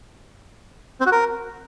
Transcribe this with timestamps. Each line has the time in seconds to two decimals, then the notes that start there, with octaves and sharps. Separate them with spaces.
1.01 C4
1.06 F#4
1.12 A#4